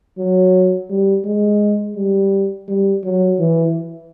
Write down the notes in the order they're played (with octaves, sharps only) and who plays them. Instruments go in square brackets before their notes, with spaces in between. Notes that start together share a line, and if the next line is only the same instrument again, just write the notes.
[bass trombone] F#3
G3
G#3
G3
G3
F#3
E3